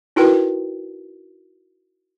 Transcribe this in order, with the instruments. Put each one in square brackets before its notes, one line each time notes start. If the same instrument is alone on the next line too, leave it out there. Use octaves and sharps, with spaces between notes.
[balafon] D#4 E4 F#4 A#4 B4 G5